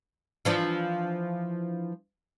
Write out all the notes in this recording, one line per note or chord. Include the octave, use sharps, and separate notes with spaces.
E3 F3 D4